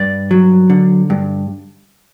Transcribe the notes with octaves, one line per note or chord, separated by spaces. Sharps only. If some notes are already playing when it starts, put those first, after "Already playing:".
Already playing: G2 D5
F#3
D3
G2